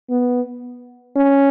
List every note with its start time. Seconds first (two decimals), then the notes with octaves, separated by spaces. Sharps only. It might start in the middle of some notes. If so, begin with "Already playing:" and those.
0.10 B3
1.16 C#4